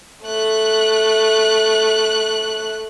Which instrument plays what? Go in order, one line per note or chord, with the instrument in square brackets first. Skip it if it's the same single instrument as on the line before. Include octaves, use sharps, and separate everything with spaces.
[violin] A3 F#6